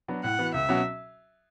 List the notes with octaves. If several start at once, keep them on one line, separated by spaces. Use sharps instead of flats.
F#3 B3 D4 F#4
A2 F#5
E3 B3 F#4
C#2 E5
B2 F#3 C#4 F#4